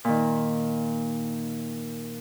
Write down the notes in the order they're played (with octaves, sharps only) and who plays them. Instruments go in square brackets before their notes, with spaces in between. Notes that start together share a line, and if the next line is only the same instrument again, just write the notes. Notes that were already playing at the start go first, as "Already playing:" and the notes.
[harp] A#2 D#3